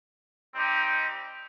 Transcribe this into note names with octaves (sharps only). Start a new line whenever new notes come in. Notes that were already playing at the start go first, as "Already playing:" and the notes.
G3 C4 D#4 G4